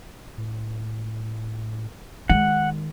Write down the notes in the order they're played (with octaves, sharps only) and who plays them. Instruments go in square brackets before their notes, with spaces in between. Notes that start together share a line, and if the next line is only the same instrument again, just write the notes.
[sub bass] A2
[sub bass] D#3 [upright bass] G#3 [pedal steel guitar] F#5